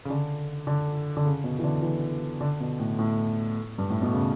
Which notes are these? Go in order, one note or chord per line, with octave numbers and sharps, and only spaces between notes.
C#3
D3
D3
D3
C#3
B2
E3
D3
E3
D3
B2
A2
A2
G2
A2
B2
C#3